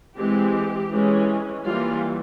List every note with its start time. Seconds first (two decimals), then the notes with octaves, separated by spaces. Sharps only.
0.16 E3 G#3 C4 G4
0.91 E3 G#3 C#4
1.66 E3 G3 A#3 F4